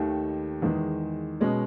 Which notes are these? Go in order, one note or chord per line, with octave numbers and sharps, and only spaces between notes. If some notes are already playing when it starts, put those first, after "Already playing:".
Already playing: D#2 D#3 A3
E2 D#3 G#3
B2 G#3 C#4